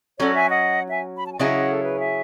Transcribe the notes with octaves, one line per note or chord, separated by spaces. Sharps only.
F#3 C#4 F#4 A4 C#5
E5 G#5
D#5 F#5
E5 G#5
B5
A5
G#5
C#3 F#3 C#4 E4 G#4 D#5 F#5
A4
B4
E5 G#5